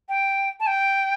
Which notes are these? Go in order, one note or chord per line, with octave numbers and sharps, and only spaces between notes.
G5
A5
G5